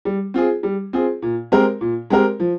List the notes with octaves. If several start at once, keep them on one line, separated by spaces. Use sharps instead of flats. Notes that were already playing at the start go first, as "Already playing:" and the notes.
G3
C4 F4 G#4
G3
C4 F4 G#4
A#2
G#3 C4 G4 A#4
A#2
G#3 C4 G4 A#4
F3